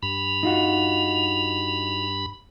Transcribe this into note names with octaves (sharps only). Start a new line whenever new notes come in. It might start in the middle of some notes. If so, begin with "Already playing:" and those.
G2 B5 F7
D#4 F4 F#4